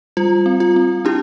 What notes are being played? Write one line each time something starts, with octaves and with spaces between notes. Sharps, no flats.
G3 F4
C4
F4
C4
D4 E4 G4